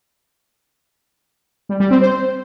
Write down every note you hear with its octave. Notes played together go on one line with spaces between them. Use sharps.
G3
G3
C4
C5